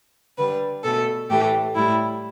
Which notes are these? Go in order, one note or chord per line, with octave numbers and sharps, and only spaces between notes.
D3 G3 B4
B2 A3 A4
A2 E3 A3 G4
A2 G3 E4